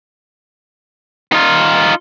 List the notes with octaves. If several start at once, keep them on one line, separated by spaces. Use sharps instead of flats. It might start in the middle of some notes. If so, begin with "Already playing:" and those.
D#4 F4